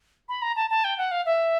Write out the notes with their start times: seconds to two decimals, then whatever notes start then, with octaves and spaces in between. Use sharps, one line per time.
0.29 B5
0.42 A#5
0.56 A5
0.70 A5
0.84 G5
0.98 F#5
1.11 F5
1.26 E5